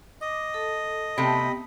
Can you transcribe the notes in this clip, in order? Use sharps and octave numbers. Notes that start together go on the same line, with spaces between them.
D#5 D6
A4 A5
C3 A3 B3 G4 G5 B5